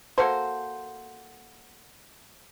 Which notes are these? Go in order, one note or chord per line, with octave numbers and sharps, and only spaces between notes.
A#3 F#4 A4 C5